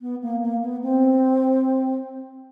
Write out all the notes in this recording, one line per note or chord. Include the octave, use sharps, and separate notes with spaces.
B3
A#3
A#3
B3
C4